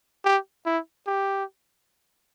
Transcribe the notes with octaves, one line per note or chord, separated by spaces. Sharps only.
G4
E4
G4